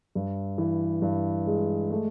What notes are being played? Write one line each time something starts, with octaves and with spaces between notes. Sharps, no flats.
G2
E3
G2
G#3
A3